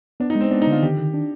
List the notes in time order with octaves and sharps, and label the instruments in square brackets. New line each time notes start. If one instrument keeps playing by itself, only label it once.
[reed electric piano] B3 [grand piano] D4
[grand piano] D#4
[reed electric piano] G#3
[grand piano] C4
[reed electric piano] B3 [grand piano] D4
[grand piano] D#4
[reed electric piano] D3 [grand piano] F4
[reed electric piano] D#3 [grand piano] G4
[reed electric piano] D#3
D4